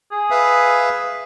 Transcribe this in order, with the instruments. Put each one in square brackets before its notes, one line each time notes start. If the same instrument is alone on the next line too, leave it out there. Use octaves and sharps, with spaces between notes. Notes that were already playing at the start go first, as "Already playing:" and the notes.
[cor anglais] G#4
[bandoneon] B4 E5 F5